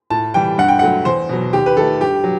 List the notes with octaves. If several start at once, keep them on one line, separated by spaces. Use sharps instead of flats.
A2 A5
E3 G3 G5
G2 F#5
G5
F#3 A3 F#5
E2 C5
B2 F#3
D#2 G4
B4
D#3 A3 A4
G2 G4
F#3